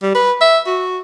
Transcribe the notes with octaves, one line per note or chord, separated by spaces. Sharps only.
G3
B4
E5
F#4